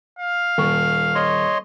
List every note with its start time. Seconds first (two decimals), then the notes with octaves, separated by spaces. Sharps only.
0.19 F5
0.58 D#1 C#6
1.15 C#5 D#5 C6